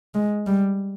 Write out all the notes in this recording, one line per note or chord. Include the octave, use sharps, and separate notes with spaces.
G#3
G3